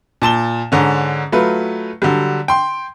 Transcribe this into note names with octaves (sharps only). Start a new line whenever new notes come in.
A#2 A5 E7 G7
G#2 D3 C#4
F#3 A3 F4 B4
D3 F#3 G3
G5 C6